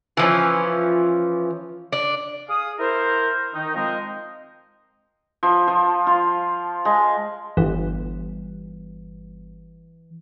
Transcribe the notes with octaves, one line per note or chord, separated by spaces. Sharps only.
E3 F3 C#4
D4
G#4 F5 D#6
E4 A#4 C5
D#3 D#4
F3 G#3 C4 A#4 C5 D#5
F3
F3
F4
G#3
G1 E3